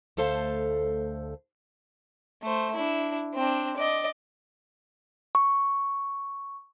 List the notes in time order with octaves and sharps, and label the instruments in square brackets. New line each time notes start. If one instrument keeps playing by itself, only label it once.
[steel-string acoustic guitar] D2 A3 A4 C5 F5
[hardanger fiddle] A3 C5
D4 E4
C4 D4
D5 D#5
[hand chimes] C#6